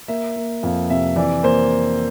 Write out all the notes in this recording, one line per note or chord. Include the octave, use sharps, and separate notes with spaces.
A#3 E5
A#3
F2 F5
C3 E5
E3 D5
A#3 C5